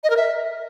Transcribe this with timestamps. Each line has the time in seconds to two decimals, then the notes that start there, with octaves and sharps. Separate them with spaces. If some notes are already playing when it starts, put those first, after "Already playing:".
0.04 D#5
0.10 A#4
0.17 E5